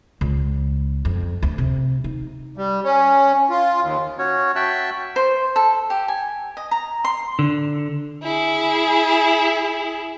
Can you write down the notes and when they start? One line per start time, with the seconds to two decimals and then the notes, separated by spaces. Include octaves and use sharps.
0.21 C#2
1.05 F2
1.42 D2
1.58 C3
2.04 D#4
2.57 G3
2.84 C#4
3.50 F4
3.82 D#2
4.18 C#4 F#4 C#5
4.56 F#4 E5 G5 A5 E6 F#6
5.16 C5
5.56 A4
5.90 G4
6.08 G#5
6.57 D#5
6.71 A#5
7.05 C6
7.39 D3
8.23 E4 G#4